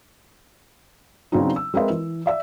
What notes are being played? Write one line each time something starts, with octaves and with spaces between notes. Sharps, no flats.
C#3 F#3 B3 C4 D4 D#4
E6
G#3 C4 A#4 B4 D#5 E5
E3
D5 E5 E6